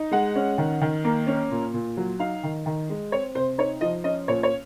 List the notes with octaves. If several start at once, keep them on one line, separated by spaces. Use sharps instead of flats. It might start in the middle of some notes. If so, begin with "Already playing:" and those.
Already playing: D#4
G#3 F#5
C#4
D#3
D#3
A#3
C#4
A#2
A#2
F#3
D#4 F5
D#3
D#3
G#3
C4 C#5
C3 C5
D#4 C#5
F3 D#5
C#4 D#5
A#2 C#5
C#5